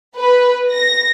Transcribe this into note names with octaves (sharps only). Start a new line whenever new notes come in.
B4
A#6